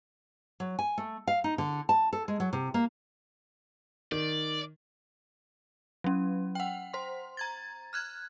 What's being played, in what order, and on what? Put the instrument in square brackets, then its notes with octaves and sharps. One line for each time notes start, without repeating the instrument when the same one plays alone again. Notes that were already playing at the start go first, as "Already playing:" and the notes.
[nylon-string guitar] F#3
G#5
A3
F5
D#4
D3
A5
A4
G#3
F#3
C3
A#3
[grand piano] D#3 [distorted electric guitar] D5
[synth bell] F#3 C#4
F#5 G5
C5 C6
A#5 G#6 A6
F6 F#6 G#6